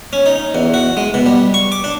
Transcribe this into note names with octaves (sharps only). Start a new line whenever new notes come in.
C#4
D#4
E2
F#4
G#3
B2
G3
C#6
D6
D4